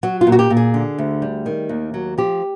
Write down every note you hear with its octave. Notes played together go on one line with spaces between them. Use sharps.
F#3 F#4
F4
A#2
F#4
G4
A#2
G#4
D3
D2
G3
D#3
D#2
F#3
F3 G4